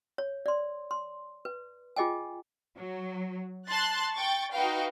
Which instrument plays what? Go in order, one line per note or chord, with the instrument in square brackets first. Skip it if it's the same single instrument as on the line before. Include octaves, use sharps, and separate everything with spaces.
[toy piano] C#5
D5 C6
C6
B4
F4 G#4 D#5 G5 G#5
[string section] F#3
A5 C6 F#6 A6
G5 C#6 A6
D#4 F#4 B4 F5 G5